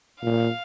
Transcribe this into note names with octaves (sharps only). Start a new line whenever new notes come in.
A#2 F5